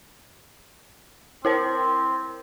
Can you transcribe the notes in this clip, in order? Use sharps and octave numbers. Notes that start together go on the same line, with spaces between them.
C4 E4 A#4 C5